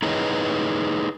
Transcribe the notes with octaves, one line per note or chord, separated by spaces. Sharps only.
D#4 E4 G#4 B4 C#5 D#5